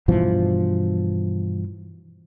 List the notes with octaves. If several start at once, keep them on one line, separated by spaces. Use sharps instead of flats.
G2 B2 E3 F3